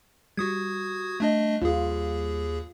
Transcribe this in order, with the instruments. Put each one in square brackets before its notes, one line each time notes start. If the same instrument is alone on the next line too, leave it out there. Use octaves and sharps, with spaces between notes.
[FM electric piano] G3 [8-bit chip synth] F#4 D#6 G#6
[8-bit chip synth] A3 D4 D#5
[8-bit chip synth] D#2 G#4 [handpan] F4